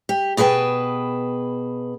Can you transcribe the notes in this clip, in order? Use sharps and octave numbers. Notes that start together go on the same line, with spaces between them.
G4
B2 G#4 B4 G5 A5